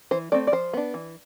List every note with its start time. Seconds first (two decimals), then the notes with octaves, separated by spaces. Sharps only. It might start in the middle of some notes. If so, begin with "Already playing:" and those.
0.11 E3 C5
0.32 A3 C4 D5
0.47 D5
0.52 F3 C5
0.73 B3 D4
0.94 E3